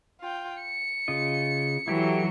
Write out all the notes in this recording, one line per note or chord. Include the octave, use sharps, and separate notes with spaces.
F4 G5
C#7
C#3 F4 D#5
E3 F#3 E4 G4 A4